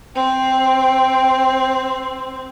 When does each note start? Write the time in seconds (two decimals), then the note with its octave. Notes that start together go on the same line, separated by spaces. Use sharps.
0.15 C4 G5